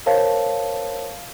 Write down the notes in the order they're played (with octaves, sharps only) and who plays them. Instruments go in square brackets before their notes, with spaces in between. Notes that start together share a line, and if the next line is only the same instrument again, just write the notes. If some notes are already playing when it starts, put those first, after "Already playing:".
[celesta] A#4 C5 C#5 F5 A5